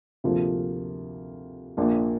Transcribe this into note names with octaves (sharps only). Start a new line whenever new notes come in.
D2 C3 F3 A#3 F4
A#1 A#2 A#3 D4 F4